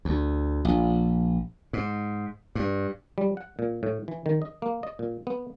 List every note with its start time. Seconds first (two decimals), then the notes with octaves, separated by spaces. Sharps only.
0.05 D2
0.65 A#1
1.73 G#2
2.55 G2
3.18 G3
3.37 F#5
3.59 A#2
3.83 A2
4.08 E3
4.26 D#3
4.42 D#5
4.62 A#3
4.83 D#5
4.99 A#2
5.27 B3